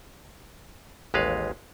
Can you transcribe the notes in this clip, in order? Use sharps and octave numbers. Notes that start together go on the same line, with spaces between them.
A1 D#2 G#3 B4 F5